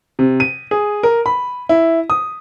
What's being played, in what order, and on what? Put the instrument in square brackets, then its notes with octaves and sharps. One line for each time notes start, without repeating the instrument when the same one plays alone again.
[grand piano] C3
D#7
G#4
A#4
B5
E4
D#6